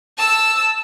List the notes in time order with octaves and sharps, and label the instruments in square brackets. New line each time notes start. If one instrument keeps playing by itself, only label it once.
[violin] A5 E6